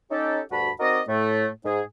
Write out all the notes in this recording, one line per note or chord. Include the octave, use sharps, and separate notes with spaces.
C#4 D#4 G4 A4
D2 G2 F#4 A5 B5
C4 D#4 F#4 A#4 D5 D#5
A2 A3
G#2 G#4